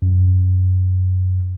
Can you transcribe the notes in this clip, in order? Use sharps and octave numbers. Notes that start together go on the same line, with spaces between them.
F#2